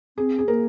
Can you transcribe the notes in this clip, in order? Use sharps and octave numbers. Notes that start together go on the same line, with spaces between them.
C4 G#4
G#4
A#3 A#4